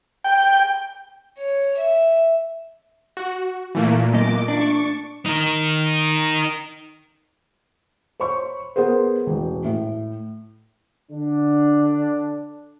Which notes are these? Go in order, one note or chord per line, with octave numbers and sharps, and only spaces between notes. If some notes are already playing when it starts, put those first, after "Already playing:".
G5
C#5
E5
F#4
A#2 E3 A3 A#3
F#2 B3 D#5 D6
D4 C#6
D#4 A#4
C5 C#5 B5 C#6
B3 G#4 A#4 C5
E1 A1
A2
D3 D4